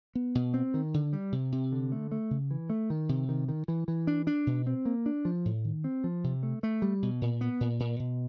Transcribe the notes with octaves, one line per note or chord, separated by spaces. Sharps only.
B3
B2
C4
D#3
D3
G3
C3
C3
D3
A3
A3
C#3
E3
A3
D#3
C3
D#3
D#3
E3
E3
D4
D4
B2
C4
A#3
D4
F3
A2
D#3
C4
F3
C3
A3
A3
G3
B2
A#2
B3
A#2
A#2
B2